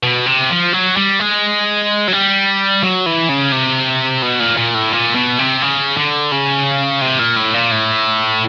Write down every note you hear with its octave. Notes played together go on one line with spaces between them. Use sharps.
B2
C3
F3
F#3
G3
G#3
F#3
G3
F#3
E3
C#3
C3
B2
A#2
A#2
A2
A#2
B2
C3
C#3
D3
C#3
C3
A#2
A2
A#2
A2